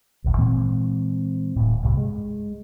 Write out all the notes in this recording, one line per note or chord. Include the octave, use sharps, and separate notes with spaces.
D1 G#1 D2
A#2 E3 G#3 C4
D1 A2
C2 G2 C3 G3
G#3